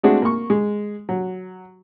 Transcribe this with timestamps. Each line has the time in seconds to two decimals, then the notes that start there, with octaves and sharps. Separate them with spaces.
0.03 G#3 A3 C4 D4 F#4 G#4
0.22 A#3 C#6
0.50 G#3
1.09 F#3